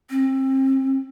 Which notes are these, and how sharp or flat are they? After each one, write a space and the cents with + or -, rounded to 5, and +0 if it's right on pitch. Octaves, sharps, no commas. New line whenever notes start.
C4 +30